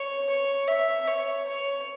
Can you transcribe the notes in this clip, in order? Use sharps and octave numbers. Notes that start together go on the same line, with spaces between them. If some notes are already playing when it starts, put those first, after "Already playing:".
Already playing: C#5
C#5
E5
C#5
C#5